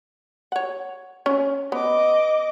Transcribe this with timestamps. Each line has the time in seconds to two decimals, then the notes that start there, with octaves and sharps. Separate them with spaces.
0.52 C#5 F#5
1.26 C#4
1.72 B3 D#5 D6